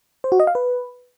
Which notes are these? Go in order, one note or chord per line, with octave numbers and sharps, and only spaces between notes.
C5
F#4
D#5
F5
B4